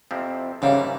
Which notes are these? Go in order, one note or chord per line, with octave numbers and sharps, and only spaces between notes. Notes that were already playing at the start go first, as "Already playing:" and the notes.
F2 C3 F3 C4 E4
G#2 C#3 E3 G3 A#3